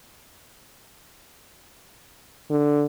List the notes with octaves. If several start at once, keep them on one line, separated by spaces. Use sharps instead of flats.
D3